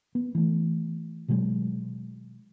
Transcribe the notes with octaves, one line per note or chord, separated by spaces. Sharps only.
B3
E3 A3
B2 D#3 F#3 G#3